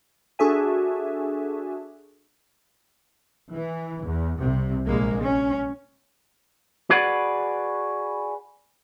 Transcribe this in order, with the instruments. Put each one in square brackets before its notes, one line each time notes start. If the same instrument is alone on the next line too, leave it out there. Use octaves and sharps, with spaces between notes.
[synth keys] D4 F#4 G#4 A4 E5 G#5
[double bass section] E3
E2
C2 C3
A#1 G#3 A#3
C#4
[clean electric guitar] F#4 G#4 B4 D5 F#5